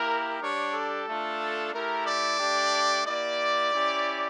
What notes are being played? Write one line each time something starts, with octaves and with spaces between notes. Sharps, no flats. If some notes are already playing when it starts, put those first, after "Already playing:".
Already playing: A#3 E4 G4 A#4
G3 D4 G4 C#5
A4
A3 D4 F4
A3 E4 G4 A#4
D5
A3 D4 G4
A#3 E4 G4 D5
C#4 E4 G4